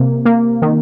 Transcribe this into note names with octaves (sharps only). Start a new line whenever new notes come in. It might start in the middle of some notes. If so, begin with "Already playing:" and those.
Already playing: C3 A#3
A#3
D#3